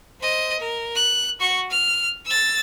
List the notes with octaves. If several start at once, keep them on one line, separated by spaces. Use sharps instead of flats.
C5 D#5
A#4
F#6
F#4 C#6
F6
E6 A6